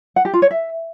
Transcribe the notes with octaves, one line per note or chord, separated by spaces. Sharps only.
F#5
G4
F4
C#5
E5